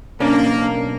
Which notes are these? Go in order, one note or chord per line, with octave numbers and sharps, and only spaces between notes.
B1 A#3 C#4 D4